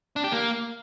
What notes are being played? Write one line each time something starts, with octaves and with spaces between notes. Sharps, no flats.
D4
G4
A#3